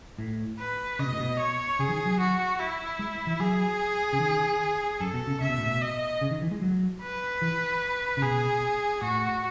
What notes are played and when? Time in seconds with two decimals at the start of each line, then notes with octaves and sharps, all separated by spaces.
0.19 A2
0.59 B4
0.99 C#3 D#5
1.06 B2
1.13 A2
1.20 B2
1.39 C#5
1.79 C#3 G#4
1.89 E3
1.93 D#3
2.06 F#3
2.19 F#4
2.59 E4
2.99 G#3
3.27 E3
3.40 F#3 G#4
4.13 C#3
4.20 D#3
5.00 F#2 A4
5.14 B2
5.27 C#3
5.41 C#3 E5
5.49 B2
5.58 A2
5.66 B2
5.81 D#5
6.21 C#3
6.31 D#3
6.42 E3
6.51 G#3
6.62 F#3
7.02 B4
7.42 E3
8.17 C#3
8.22 B2 G#4
9.02 A2 F#4